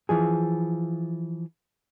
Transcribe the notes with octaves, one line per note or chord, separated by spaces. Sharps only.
E3 F3 G#4